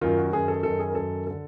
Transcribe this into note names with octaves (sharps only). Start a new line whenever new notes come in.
F#2 D#3 F4
F#4
F#2 D#3 G#4
A4
F#2 D#3 A4
G#4
A#4
F#2 D#3 A4
D3 A4